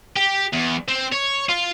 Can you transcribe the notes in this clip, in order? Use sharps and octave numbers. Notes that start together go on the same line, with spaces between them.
G4
E2
C4
C#5
F4